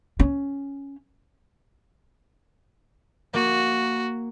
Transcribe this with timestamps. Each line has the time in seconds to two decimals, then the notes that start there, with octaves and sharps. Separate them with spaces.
0.20 C#4
3.34 A#3 F#4